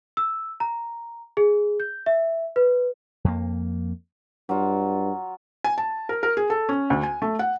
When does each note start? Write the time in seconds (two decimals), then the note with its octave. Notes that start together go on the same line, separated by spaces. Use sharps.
0.17 E6
0.60 A#5
1.37 G#4
1.80 G6
2.06 E5
2.56 B4
3.24 F2 A#3
4.49 G2 F#3 F4
5.64 G#5
5.78 A5
6.09 A#4
6.23 A#4
6.37 G#4
6.50 A4
6.69 C#4
6.90 D2
7.03 G#5
7.22 A3
7.39 F#5